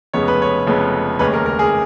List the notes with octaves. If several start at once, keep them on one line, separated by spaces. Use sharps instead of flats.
F1 F2 C#3 G#3 B3 C#5
B4
C#5
F1 F2 C#3 G#3 B3
F1 D#2 C#3 G#3 C#4 B4
A#4
A#4
G#4